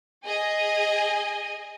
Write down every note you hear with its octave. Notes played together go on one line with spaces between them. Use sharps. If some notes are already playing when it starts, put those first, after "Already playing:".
G#4 D#5 G#5